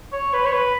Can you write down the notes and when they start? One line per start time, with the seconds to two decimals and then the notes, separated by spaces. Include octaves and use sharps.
0.13 C#5
0.33 B4
0.45 C#5
0.53 B4